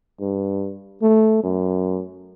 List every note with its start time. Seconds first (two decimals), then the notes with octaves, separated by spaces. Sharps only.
0.20 G2
1.02 A3
1.43 F#2